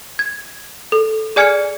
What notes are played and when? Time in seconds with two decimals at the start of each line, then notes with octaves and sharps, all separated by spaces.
0.19 G#6
0.92 A4
1.36 G#4 D5 G#5 F6 G#6 C#7